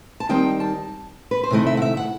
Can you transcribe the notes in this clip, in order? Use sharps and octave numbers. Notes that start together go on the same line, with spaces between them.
A5
D#3 G3 C4 D#4 G5
A5
B4
C5
C3 D#3 A3 E4 D#5
E5
F#5
E5
F#5